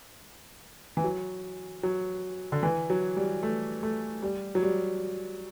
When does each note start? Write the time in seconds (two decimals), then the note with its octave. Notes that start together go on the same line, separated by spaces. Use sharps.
0.97 E3
1.04 F#3
1.83 F#3
2.52 D3
2.63 E3
2.90 F#3
3.16 G3
3.43 A3
3.83 A3
4.23 G3
4.55 F#3
4.63 G3